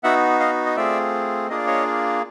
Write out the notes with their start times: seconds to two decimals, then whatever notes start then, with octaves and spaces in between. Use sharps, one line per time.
0.04 B3 D#4 F#4 E5 F#5
0.40 D#5 F5
0.66 D#5
0.76 A3 C4 F4 G#4 D5 E5
1.49 A#3 D4 F4 G#4 D#5
1.58 D5
1.67 C#5 D#5